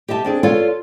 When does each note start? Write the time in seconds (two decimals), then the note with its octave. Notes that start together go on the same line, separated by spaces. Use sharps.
0.08 G4 D#5 E5 A5
0.24 C4 D4 G#4
0.43 F4 A4 B4 C#5 D5 F5